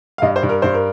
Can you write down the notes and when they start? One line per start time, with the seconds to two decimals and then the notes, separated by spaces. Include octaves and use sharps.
0.18 F5
0.22 G2 D#5
0.36 C5
0.43 G2
0.49 A#4
0.62 G2 C5
0.74 A#4